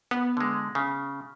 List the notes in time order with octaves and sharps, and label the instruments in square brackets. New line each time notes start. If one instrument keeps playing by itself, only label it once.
[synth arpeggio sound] B3
[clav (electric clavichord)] D3 G#3
C#3